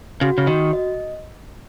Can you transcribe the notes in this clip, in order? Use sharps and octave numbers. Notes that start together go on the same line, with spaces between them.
C#3 F#4
C#3
D#3 F#4
D#5